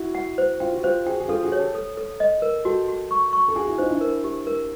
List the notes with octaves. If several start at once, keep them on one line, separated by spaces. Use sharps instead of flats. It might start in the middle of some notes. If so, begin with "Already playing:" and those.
Already playing: E4 F#4
F#5
C5
F4 G5
F#4
F4 G4 C5
F#4 G#4 G5
G#4
F4 G4 A4
F#4 G#4
C#5
G4 A4
A4
A4
D#5
A#4
F#4 G4 A4
F#4
C#6
C#6
A4
F#4 G#4 G#5
E4 F#4
D#4 F4 C5
D4 E4
A#4
G4
A#4